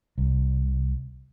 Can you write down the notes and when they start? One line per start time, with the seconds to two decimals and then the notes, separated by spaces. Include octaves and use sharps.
0.18 C2